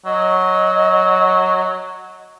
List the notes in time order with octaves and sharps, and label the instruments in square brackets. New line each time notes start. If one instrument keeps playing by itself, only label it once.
[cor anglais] F#3 [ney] D#5